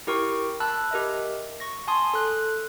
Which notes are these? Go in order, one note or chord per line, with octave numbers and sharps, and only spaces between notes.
E4 G4 A#4 G5 C#6
A5 B5 E6 F#6
G4 A#4 D#5 E5
C#6 A#6
G#5 A5 C6 D#6
A4 F#6